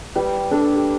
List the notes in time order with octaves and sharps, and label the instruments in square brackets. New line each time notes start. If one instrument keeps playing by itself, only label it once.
[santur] G3 [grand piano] B4
[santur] D4 [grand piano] A4
[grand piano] G4